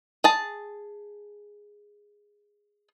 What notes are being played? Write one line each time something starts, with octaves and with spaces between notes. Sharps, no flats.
G#4 A5